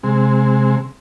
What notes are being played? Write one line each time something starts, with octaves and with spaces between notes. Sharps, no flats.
C3 G#3